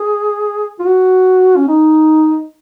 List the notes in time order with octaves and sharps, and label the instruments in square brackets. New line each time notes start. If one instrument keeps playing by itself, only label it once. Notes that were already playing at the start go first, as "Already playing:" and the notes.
Already playing: [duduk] G#4
F4
F#4
C#4
D#4